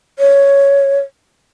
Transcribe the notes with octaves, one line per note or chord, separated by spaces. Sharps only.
C#5